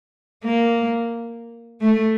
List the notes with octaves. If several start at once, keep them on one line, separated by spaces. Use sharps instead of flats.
A#3
A3